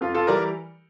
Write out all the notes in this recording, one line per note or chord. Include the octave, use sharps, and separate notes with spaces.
F2 F4
F4 A4
E3 G3 A#4 D5